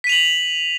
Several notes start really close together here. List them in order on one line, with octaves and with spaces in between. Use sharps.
B6 D#7 F7 F#7